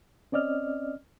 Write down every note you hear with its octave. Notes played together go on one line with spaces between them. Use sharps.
C4 C#4 D5 D#5 F6